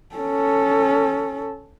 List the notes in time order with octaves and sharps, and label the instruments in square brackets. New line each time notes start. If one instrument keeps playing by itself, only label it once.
[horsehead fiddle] C#4 A4